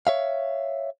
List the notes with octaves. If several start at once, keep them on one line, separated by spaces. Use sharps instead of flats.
C#5 E5 F5